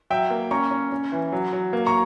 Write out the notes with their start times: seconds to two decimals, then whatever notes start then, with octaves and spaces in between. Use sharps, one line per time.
0.10 F#3 E5 G5
0.30 A#3
0.51 C#4 A#5 C#6
0.71 C#4
0.92 C#4
1.12 E3
1.32 F#3
1.52 F#3
1.73 A#3
1.86 A#5 C#6